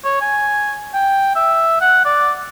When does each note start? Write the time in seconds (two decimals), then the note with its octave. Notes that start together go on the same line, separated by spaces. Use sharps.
0.05 C#5
0.21 G#5
0.94 G5
1.36 E5
1.81 F#5
2.05 D5